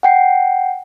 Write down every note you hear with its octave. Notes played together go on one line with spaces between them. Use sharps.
F#5 G5 C7